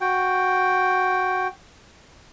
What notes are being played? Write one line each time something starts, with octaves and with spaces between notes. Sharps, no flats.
F#4 G5